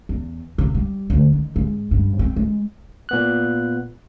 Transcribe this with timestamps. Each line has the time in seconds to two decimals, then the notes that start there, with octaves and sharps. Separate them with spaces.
0.09 E2
0.58 C3
0.74 G3
1.10 D2
1.33 D#3
1.56 G#2
1.91 G2
2.19 C4
2.36 G#3
3.09 A#2 B3 F#6